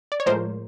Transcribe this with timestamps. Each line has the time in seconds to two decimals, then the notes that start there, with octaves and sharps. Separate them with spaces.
0.12 D5
0.20 C#5
0.26 A2 F3 G#3 A#4 C5